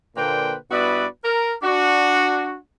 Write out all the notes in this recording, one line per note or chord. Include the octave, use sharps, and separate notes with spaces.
A#2 D3 A#3 B4 C5 G5
G2 B3 E4 F#4 B4 D5
A#4
D4 F#4